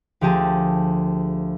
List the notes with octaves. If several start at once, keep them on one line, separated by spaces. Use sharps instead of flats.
D2 F3 G4 G#4 A5